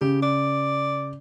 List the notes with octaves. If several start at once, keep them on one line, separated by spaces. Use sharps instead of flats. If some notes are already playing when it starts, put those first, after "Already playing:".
C#3 G4
D5